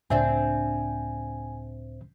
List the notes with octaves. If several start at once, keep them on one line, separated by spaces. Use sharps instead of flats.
C#2 A2 C4 D4 C5 E5 G#5